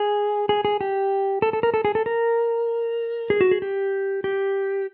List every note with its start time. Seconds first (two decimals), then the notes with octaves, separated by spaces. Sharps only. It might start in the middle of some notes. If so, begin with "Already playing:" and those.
Already playing: G#4
0.49 G#4
0.65 G#4
0.81 G4
1.42 A4
1.53 A4
1.63 A#4
1.74 A4
1.85 G#4
1.95 A4
2.06 A#4
3.30 G#4
3.41 F#4
3.51 G#4
3.62 G4
4.24 G4